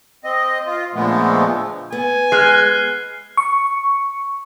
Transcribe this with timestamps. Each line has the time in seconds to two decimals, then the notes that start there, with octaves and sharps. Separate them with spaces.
0.24 C4 D#5
0.66 F4
0.94 A#2 D3 F3 G#3 A3 B3
1.92 B3 G#5
2.32 G#3 F6 F#6 C7
3.37 C#6